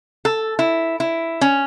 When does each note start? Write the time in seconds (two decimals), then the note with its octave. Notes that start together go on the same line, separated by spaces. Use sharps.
0.25 A4
0.59 E4
1.00 E4
1.41 C#4